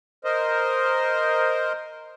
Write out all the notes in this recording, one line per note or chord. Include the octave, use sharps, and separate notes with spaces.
A#4 C5 D#5